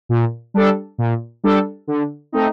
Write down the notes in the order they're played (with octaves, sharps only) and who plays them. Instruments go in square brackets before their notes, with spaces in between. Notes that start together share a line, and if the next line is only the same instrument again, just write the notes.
[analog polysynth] A#2
G3 D4 A4
A#2
G3 D4 A4
D3
A3 C4 D#4